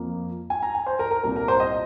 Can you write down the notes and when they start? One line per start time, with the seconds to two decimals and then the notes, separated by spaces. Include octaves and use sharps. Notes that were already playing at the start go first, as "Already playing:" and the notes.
Already playing: F2 F3 A#3
0.50 G#5
0.62 A#5
0.75 G#5
0.87 C5
0.99 A#4
1.11 A#4
1.24 C2 A#2 A#3 A#4
1.36 A#4
1.48 C5
1.60 D#5